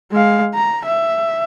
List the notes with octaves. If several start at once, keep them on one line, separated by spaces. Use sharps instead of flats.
G#3 F5
A#5
E5